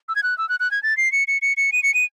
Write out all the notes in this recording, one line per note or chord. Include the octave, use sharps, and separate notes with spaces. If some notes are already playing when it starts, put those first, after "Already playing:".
E6
G#6
F#6
E6
F#6
F#6
G#6
A6
C7
C#7
C#7
C#7
C#7
D#7
C#7
D#7